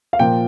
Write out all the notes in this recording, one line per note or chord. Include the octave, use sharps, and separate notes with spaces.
F5
A#2 F3 G5